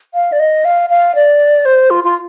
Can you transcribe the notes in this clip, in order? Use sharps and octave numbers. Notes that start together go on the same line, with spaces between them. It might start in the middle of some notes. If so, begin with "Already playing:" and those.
F5
D5
D#5
F5
F5
D5
C5
F4
F4